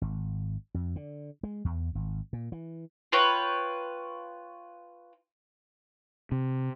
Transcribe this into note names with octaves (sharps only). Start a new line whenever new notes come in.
G#1
F2
D3
G#3
E2
G#1
A#2
E3
F4 B4 C#5 G5
C3